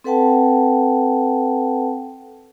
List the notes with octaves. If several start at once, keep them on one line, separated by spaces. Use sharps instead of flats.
C4 A4 B4 F#5 G5 A5